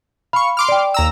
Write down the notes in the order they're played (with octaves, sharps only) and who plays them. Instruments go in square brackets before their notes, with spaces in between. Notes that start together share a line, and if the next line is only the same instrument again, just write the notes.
[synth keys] F5 C#6 [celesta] B5
[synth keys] C6 D6 F6
[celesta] D5 G5
[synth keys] D#2 A#5 E6